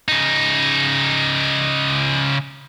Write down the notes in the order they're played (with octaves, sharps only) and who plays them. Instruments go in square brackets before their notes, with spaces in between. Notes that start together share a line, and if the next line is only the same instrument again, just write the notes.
[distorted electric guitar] C#3 D#4